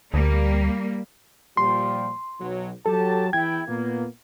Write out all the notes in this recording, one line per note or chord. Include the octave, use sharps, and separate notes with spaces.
D2 G3 A#3
A#2 F3 G3 C6
B1 F#3
F#3 G4 A4 A5
E2 E4 G5 G#6
A#2 A#3 B3